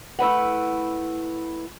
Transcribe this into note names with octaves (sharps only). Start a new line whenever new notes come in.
A3 E4 B4 F#5